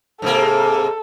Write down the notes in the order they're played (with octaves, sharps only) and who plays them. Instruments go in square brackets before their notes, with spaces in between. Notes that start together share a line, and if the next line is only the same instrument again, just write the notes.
[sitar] G#2 C3 A#3 [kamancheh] A4